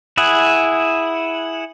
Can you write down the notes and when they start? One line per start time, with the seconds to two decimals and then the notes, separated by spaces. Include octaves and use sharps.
0.17 E4 G#4 F#5